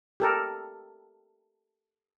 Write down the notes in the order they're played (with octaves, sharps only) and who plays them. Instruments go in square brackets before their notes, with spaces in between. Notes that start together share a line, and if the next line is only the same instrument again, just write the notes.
[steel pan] G4 A4 A#4